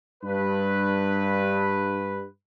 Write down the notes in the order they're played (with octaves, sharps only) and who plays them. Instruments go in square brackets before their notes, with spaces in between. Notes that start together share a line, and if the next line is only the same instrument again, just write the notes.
[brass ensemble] G2 B4